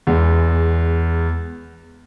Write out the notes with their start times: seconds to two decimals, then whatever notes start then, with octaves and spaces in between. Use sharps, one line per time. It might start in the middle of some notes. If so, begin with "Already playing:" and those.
0.07 E2 G#3